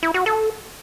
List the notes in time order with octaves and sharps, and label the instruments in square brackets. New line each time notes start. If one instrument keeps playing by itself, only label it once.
[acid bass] E4
F#4
A4